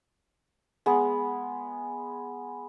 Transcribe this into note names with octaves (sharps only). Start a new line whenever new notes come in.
G#3 B3 G#4